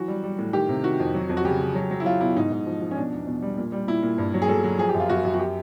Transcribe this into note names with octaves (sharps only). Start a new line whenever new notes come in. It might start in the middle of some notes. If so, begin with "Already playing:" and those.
Already playing: E3 F#3 F#4
G3
G3
A2
D#3 G4
C3
D#3 F#4
F2
F#3
F2
F#4
C#3 G4
C#3
F#3
F#3
E4
F#3 F4
B2 E4
G#2 D#4
G#2
F3
F3
C#4
B2 D4
E2
B2
G3
A#2
G3
A#2 E4
A#2
G2
F#3
G#4
F#3 A4
F#3
F3 G#4
G4
F#2
F4
F#2 F#4
F#2
F#4
G4